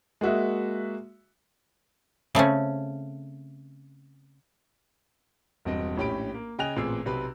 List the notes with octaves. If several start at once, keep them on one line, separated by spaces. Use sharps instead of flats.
G#3 A#3 F#4 E5
C#3 A3 C4 C#4
E1 G2 C4 D#5
A#1 A2 C#4 G4 B5 D7
A#3
C#3 D#5 G5 G#5 F#6 F7
A1 A#2 C4 G#4 E6
B1 C3 C4 B4